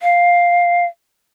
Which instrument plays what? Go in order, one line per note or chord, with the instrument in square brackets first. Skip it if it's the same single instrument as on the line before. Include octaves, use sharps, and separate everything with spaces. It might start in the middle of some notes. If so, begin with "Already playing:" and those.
[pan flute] F5